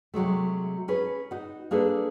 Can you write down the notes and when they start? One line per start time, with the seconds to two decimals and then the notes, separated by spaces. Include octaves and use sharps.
0.14 C3 F#3 G#3 A3
0.88 C#4 G#4 B4
1.31 D#4 F#4
1.71 A#3 D4 G#4 A4 B4